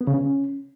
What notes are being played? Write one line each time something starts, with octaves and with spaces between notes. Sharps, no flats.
B3
C#3
C#4